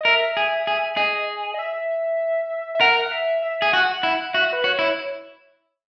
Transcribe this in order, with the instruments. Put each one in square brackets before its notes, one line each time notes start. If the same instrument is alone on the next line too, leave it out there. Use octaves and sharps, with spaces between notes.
[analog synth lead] D#5
[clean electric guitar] A#4 [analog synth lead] E5
[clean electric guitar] G#4
G#4
[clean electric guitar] G#4 [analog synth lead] D#5
[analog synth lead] D#5
E5
E5
[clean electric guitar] A#4 [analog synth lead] F#5
[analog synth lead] F#5
E5
E5
[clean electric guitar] G#4
[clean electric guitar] F#4 [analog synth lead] F#5
[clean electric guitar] E4 [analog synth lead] F#5
[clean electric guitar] F#4 [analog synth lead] E5
[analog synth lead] B4
[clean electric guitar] F#4 [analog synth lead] C#5
[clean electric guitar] E4